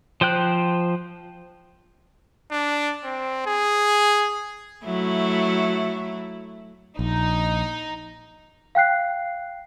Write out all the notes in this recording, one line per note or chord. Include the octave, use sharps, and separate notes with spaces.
F3 C5 G5 F#6
D4
C4
G#4
F#3 A3 E4
A#1 D#4
F5 G5 F#6 C7